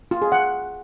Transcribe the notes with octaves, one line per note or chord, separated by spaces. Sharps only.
F4
G#4
F#5